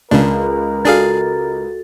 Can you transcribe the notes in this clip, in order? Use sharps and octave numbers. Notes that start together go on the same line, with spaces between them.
C#2 C#3 D4 A#4
D4 F#4 G#4 A4 F5 A6